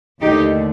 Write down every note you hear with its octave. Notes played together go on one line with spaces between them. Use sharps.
D#2 D3 A3 D#4 G4